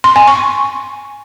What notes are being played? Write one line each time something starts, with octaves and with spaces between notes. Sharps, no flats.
C6
G#5
C#6